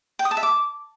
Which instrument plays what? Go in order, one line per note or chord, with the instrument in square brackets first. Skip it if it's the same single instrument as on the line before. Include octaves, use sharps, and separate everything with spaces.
[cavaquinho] G5
D#6
A5
E5
D6